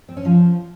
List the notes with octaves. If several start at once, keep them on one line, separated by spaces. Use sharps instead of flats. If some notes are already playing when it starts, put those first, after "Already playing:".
C4
C#4
F3